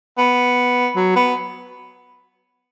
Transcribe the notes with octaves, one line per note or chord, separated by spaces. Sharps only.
B3
F#3
B3